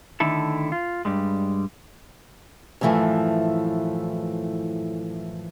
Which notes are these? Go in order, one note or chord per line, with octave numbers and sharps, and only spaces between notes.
D3 D#3 A3 E4 A4
F4
G2 G3 G#3
F#2 A2 E3 F3 A3